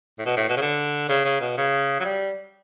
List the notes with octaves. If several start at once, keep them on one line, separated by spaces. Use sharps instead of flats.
A2
B2
A2
B2
C#3
D3
C#3
C#3
B2
C#3
F#3
G3